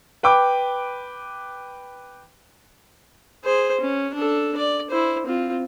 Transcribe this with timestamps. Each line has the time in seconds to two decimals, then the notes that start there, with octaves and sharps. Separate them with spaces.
0.23 B4 G5 B5 D6
3.44 G#4 C5
3.81 C#4
4.14 D4 A4
4.57 D5
4.91 E4 C5
5.26 C4 F4